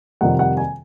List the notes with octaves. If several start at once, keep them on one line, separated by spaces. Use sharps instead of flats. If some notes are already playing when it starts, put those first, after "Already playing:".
F2 C3 D#3 G3 F#5
F#5
G#5